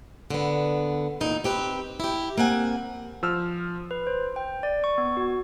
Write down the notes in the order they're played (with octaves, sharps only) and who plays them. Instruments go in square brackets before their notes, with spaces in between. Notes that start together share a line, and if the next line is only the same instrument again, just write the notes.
[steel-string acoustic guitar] D3 B3
E2 A#2 D#4
C4 G4 B4
E4 G4
A#3 C4 F#5 G#5
[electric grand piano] F3 E6 F6
[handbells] B4
C5
G5
D5
C#6
B3
F#4